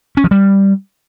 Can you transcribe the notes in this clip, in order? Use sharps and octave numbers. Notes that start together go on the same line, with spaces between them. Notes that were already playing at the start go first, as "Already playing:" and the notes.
C#4
F3
G3